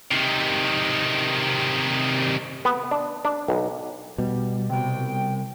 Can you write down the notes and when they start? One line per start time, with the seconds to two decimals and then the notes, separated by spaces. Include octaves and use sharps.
0.11 C3 D#3
2.65 B3
2.91 D4
3.25 D4
3.48 B1
4.18 B2 G3
4.70 C3 G3 G5